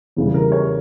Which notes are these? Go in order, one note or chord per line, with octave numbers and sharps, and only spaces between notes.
E2 C#3 E3 G3
A#4
C#5